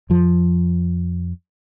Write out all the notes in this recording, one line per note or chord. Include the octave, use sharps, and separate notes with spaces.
F2 F3